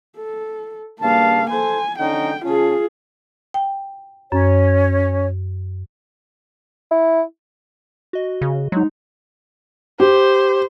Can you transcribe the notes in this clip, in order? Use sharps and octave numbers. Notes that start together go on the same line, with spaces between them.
A4
G2 C#3 A#3 F5 A5
A4 C5 G#5
D3 C#4 D#4 G5
C#3 C#4 F4 G#4 A5
G5
F#2 C#4 C#5
E4
F#4 D#5
C#3
F#3 G#3 D#4
G4 C5